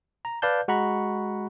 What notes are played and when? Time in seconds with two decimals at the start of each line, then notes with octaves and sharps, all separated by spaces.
0.25 A#5
0.42 B4 D5 F5 A5 G6
0.68 G#3 F#4 F#5 A#5 B5 C#6